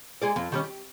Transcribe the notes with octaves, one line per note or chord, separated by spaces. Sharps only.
G#3 G#4 D5
F2
D#3 G3 C#4
G4